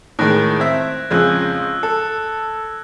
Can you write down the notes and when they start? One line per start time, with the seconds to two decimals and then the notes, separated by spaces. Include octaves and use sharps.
0.19 A2 D#3 G#3 F#6 A#6 D7
0.60 C4 E5 G#6
1.11 F2 C#3 G#3 E6 F#6 G#6
1.83 A4